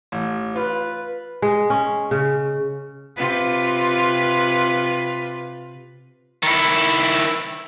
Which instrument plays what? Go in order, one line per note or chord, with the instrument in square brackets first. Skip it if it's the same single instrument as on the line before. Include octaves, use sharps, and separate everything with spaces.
[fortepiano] A1
[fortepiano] F4 [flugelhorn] B4
[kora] G#3
C#4
C#3
[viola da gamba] C3 F4 B4
[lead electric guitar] D#3 E4